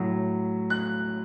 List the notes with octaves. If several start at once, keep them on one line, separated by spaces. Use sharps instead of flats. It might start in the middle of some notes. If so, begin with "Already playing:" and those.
Already playing: A2 F#3
F#6